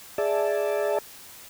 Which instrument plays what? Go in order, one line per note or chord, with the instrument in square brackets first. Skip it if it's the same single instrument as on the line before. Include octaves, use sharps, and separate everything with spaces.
[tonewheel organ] G#4 D5 E5 A5